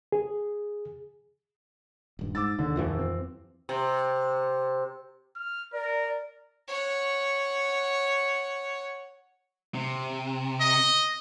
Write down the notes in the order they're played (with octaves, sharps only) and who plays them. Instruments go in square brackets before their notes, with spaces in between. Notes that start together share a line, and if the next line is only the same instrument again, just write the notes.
[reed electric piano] G#4
[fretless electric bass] D#1 G2
[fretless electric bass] G#2 [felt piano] D6 E6 A6
[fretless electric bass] D#2 [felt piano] D3
[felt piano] D#1 [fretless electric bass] F2 E3 F3
[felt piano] C4
[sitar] C3
[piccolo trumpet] F6
[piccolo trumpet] A#4 [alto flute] D5
[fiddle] C#5 F#5
[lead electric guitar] C3
[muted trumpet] D#5